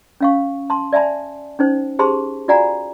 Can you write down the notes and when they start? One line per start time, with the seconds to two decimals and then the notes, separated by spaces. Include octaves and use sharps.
0.21 C#4 F5 C#6
0.70 A5 C6
0.93 D5 E5 G#5 A5 B5
1.59 C#4 D#4 C5
1.99 G4 G#4 C5 A5 B5 C6
2.48 F4 F#4 D5 F#5 G#5 A#5